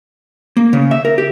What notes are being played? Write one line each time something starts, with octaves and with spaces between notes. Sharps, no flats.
A#3
C#3
E5
A#4
G4